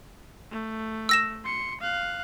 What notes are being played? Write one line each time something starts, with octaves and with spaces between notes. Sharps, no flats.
A3
E6 A#6 E7
C6 C#7
F5 F#6